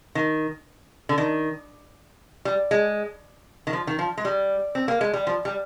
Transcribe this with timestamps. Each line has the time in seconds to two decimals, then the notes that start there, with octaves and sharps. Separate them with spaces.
0.15 D#3
1.09 D3
1.18 D#3
2.45 G3
2.71 G#3
3.67 D#3
3.73 F3
3.87 D#3
3.99 F3
4.18 G#3
4.25 G3
4.75 C4
4.88 A#3
5.01 G#3
5.13 G3
5.27 F3
5.45 G3